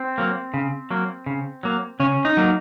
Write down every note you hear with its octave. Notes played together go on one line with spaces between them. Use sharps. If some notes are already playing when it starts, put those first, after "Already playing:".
Already playing: C4
F#3 A#3
C#3
F#3 A#3
C#3
F#3 A#3
C#3 C#4
D#4
F#3 A#3